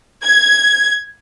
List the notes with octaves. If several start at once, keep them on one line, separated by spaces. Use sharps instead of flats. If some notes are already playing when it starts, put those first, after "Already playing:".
G#6